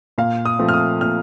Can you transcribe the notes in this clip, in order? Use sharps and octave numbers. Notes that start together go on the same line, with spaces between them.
A#2 F5
D#6
F3 A3 C4
F6
D#6
A#2 F6